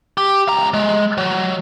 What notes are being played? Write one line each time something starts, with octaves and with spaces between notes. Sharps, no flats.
G4
C#2 A#5
G#3
F#3